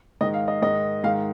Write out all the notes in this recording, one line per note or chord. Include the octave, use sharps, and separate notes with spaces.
G#2 D#3 D#5
F5
D#5
G#2 D#3 D#5
G#2 D#3 F5